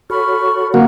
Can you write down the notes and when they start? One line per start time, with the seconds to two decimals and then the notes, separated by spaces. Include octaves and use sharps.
0.10 F#4 A4 C#5 B5 C#6 F6
0.74 D3 F#3 A#3 C4 F#4 A#5 F6